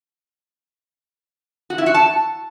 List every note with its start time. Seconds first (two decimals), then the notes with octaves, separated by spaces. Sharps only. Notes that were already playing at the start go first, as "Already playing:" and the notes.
1.70 F#4
1.78 E4
1.86 F#4
1.94 A5